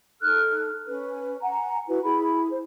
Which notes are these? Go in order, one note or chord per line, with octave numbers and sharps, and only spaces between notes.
D#4 A4 F6 F#6
C#4 B4
F#5 G#5 A#5
E4 F#4 B4
E4 G#4 B5
C5